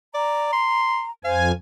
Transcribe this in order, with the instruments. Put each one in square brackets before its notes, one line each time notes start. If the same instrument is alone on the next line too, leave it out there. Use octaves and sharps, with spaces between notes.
[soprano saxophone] D5 [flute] A#5
[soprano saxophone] C6
[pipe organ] F2 G#5 [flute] C5 [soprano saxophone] F5